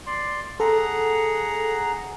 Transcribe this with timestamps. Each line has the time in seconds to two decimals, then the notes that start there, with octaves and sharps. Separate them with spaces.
0.06 D5 C6
0.60 G#4 A4 F#5 A#5